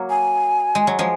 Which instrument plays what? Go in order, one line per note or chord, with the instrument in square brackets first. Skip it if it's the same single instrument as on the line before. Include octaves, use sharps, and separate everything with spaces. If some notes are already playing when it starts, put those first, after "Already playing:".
Already playing: [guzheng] F#3 A#3
[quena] G#5
[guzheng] G#3
F#3
F3 G#3